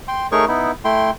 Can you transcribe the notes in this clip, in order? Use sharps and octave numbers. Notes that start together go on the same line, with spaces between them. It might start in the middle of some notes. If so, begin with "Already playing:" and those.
G5 C6
A3 D#4 G#4 A#4 C#5 C#6
B3 D#4 E4
A3 E4 G5 C6